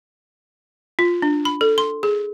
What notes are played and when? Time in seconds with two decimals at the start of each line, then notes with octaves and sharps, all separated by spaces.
0.99 F4
1.22 D4
1.45 B5
1.61 A4
1.78 C6
2.03 G#4